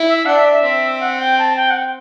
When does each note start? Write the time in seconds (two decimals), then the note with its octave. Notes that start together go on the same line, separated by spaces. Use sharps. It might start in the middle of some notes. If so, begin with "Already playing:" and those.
Already playing: E4
0.08 E5
0.26 D4 F#5
0.36 E5
0.52 E5
0.63 C4
1.00 F#5
1.19 G5
1.39 A5
1.56 G5
1.70 F#5
1.76 G5